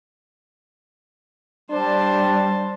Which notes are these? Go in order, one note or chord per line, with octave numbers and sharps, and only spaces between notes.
G3 D4 C5 A5